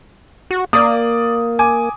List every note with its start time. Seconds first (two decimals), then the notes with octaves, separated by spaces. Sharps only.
0.51 F#4
0.73 A#3 D5 D#6
1.59 G#5 D6